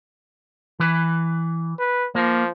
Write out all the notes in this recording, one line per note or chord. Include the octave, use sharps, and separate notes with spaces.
E3 B4
B4
F3 A#3